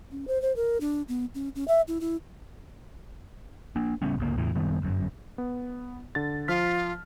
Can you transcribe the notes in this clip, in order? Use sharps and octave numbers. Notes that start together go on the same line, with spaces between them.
C#4
C5
C5
A#4
D4
B3
C#4
C#4
E5
E4
E4
A#3 D4
C#3 G3 B3 C#4
G1 C#2 A#3
E1 E2 A2 E3
F#2 D#3 G3 B3
G1 F#2
B3
D3 A6
F3 F4 F6 B6